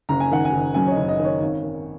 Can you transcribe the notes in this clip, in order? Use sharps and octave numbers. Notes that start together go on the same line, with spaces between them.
F#1 A#5
G#5
D#3 F#5
G#5
F#1
F#2 G#5
C#5
D#5
F#1
D#5
D#3 D#5
C#5
G#1
D#3